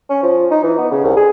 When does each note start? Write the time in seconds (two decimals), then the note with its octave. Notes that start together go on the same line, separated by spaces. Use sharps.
0.10 C#4
0.23 F3
0.51 D#4
0.64 E3
0.78 B3
0.92 C#3
1.04 C2
1.16 G#4